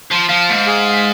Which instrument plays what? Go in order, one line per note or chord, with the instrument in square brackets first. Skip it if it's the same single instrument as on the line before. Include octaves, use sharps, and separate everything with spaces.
[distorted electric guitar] F3
[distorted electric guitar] F3 [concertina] F5
[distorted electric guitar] G#2
[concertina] G#4